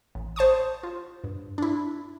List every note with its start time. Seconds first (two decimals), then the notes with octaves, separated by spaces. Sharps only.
0.15 A1
0.36 C5 A5 C#6 D#6
0.83 F4
1.24 G2
1.58 D4 E4